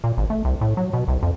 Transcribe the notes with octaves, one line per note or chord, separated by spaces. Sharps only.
A#2
G#1
A3
C2
A2
F#3
B2
C2
F2